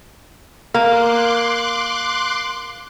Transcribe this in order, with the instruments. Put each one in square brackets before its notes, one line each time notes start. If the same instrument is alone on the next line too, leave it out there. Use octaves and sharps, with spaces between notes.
[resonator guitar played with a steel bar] A#3 [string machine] C6 D6 F#6